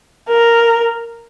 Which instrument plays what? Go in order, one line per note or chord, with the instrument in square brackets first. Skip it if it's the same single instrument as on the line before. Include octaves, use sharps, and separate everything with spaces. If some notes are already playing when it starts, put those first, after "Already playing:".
[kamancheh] A#4